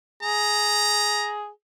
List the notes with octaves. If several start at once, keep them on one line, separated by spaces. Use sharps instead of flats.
G#4 A#5